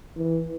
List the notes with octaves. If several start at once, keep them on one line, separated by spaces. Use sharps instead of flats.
E3